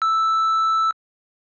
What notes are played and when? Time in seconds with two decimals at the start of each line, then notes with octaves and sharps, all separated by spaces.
0.02 E6